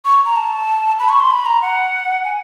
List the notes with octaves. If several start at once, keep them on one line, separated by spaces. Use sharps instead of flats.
C#6
A#5
A5
B5
C#6
C6
B5
A#5
F#5
G#5